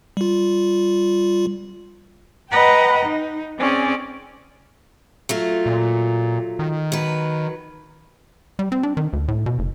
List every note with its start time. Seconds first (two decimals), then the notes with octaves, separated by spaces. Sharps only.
0.17 G3 F4
2.50 B4 D#5 F#5 G5 A#5
3.05 D#4
3.58 C4 C#4 G#4 D5
5.29 F#3 A3 F4
5.66 A#2
6.59 D#3
6.92 F#3 B4
8.59 G3
8.72 C4
8.83 D4
8.97 D#3
9.13 D2
9.28 A2
9.46 B2
9.59 F#1